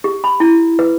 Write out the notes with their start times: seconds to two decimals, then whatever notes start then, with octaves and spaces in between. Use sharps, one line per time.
0.04 G4
0.24 B5
0.40 E4
0.79 B4